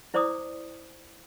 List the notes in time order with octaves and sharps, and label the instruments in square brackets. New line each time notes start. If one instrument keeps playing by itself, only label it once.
[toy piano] E4 C5 D5 A#5 D6 D#6